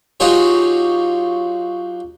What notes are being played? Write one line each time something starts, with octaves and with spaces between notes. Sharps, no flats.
F#3 D#4 F4 G4 G#4 C#5